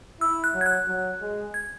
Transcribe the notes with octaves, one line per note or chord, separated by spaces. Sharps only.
E4 E6
F#6
F#3
G#6
F#6
F#3
G#3
G#6